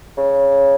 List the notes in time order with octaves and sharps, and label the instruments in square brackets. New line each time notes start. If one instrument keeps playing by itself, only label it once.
[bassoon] C#3